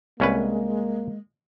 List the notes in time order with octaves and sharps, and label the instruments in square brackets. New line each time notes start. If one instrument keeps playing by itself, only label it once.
[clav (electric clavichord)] C2 C#4 B4 [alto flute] G#3 [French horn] A#3